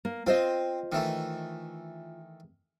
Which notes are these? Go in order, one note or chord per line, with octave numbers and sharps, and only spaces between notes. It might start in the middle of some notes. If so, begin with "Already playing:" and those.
A#3
C4 F4 C5 D#5
D#3 E3 A3